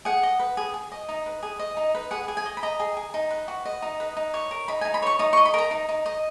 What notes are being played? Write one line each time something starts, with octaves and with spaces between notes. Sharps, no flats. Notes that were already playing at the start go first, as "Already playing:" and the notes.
G#4 F#5
D#5
B4
G#4
G#4
D#5
D#4
B4
G#4
D#5
D#4
B4
G#4 F#5
G#4
G#5
D#5
B5
D#5 A#5
G#4
G#4
D#4
B4
F#4
D#5
D#4
B4
D#4
C#5
A#4
D#4 B5
G#5
D#4
B5
C#5 C#6
D#4 D#6
C#6
D#5
B5
A#4 A#5
D#4
D#4
D#5